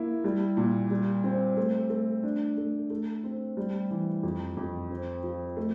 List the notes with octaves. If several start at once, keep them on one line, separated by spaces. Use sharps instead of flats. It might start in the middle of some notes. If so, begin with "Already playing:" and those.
Already playing: A#3 E4
G3
A#2
G3
C4
A3
A3
D4
A3
A3
C4
G3
E3
F2
F2
C4
F3
A3